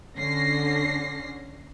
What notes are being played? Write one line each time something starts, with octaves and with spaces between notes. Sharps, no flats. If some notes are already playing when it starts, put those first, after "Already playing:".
D3 C#4 A#6 C7